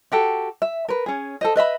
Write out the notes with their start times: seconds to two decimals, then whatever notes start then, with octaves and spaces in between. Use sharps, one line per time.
0.12 F#4 G4 A4
0.62 E5
0.88 A#4 B4
1.06 C#4 G#4
1.41 A4 C5 D#5
1.56 B4 D#5 E5 B5